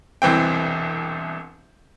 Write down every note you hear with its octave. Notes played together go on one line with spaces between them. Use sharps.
E1 C2 E3 C4 G5